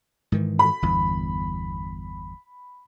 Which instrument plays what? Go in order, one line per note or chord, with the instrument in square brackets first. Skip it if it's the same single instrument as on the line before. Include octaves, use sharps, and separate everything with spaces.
[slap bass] G#2 D#3 E3
[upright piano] B5
[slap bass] G1 E2